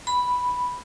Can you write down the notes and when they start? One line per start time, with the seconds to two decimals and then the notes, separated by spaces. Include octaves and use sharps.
0.07 B5